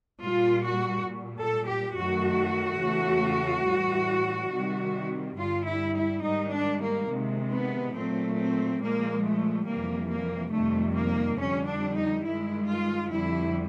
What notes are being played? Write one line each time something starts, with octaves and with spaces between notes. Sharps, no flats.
A#2 G3 F4
F#4
A#2 G3
A4
G4
F#2 D#3 F#3 A3 F#4
E2 C#3 E3 A3
A2 E3 G3
C3 D#3 G3
G2 D3 G3 F4
E4
E4
G#2 D#3 G3 D#4
D4
A#3
C3 D#3 G#3
B3
A#2 F#3 A3 C4
C4
A#2 F3 G#3 A#3
A3
F2 C3 E3 G3 A#3
A#3
F2 C3 D#3 G3 A3
A#3
F2 D3 G3 C#4
D4
D#4
G2 D#3 G#3 E4
F4
F2 D3 G3 E4